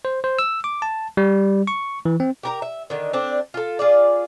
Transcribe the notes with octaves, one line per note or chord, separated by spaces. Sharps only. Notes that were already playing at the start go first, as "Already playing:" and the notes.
C5
C5
E6
D6
A5
G3
C#6
E3
C4
G4 A#4 A#5
E5
D3 D#3
C4 D4
F4 A4
F4 G#4 D5